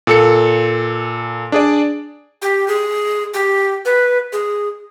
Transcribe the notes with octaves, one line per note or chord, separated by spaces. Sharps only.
A#2 A4 C#7
D4 G#4 D5
G4
G#4
G4
B4
G#4